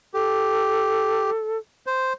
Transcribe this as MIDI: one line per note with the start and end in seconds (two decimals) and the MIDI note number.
0.14 1.30 67
0.14 1.58 69
1.87 2.13 72